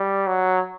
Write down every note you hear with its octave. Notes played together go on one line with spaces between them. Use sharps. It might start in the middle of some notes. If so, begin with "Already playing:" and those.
Already playing: G3
F#3